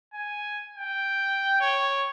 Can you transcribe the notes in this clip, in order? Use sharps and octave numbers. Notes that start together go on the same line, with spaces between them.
G#5
G5
C#5